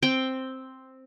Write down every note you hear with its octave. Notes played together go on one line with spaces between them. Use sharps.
C4 G5